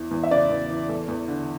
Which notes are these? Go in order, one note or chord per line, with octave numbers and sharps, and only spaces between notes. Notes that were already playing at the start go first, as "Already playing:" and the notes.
Already playing: E2 E3
E2
E5
C#3 D5
E2
E3
E2 A4
E2
D3